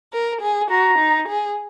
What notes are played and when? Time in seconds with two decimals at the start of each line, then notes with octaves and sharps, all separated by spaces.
0.13 A#4
0.41 G#4
0.70 F#4 A#5
0.99 D#4
1.28 G#4